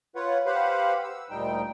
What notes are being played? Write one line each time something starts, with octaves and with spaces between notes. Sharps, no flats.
F4 B4 C#5 F#5
G4 B4 C5 F5 F#5 B5
E6
D2 A#2 G3 D#4 G5